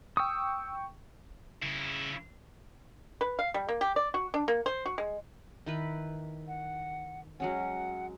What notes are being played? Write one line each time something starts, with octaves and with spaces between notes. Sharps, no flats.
G5 C#6 D#6 E6
C#3 E4
B4
F5
G3
A#3
G4
D5
F#4
D4
A#3
C5
F#4
G#3
D#3 E4 B4
F#5
F#3 G#3 C#4 F#5